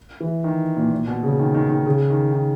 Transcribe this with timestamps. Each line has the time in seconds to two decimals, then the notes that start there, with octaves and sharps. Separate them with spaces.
0.20 E3
0.44 D#3
0.76 A#2
0.92 A#2
1.07 B2
1.23 C#3
1.39 D#3
1.55 D#3
1.70 D#3
1.86 C#3
2.10 D#3
2.32 D#3